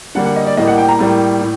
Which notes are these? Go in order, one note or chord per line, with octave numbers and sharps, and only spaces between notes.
D3 G3 A#3 F#5
F#5
D#5
D5
A2 G3 A#3 D#5
F#5
G5
A#5
A2 G3 A#3
A2